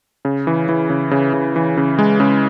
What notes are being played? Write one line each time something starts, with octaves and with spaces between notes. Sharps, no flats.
C#3
E3
E3
C#3
C#3
C#3
E3
C#3
G#3
C#3